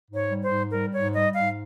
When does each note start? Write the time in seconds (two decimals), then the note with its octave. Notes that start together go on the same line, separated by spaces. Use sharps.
0.10 G#2
0.16 C#5
0.30 G3
0.44 C5
0.51 G#2
0.72 G3 A#4
0.93 G#2 C#5
1.14 G3 D#5
1.35 G#2 F5